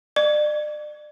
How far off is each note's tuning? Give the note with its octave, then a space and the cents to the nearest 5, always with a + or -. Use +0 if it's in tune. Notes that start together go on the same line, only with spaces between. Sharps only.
D5 +35 C#6 +40